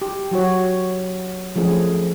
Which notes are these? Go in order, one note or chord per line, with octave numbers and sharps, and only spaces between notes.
G4
F#3 F#4 C#5
F3 A3 C#4 G#4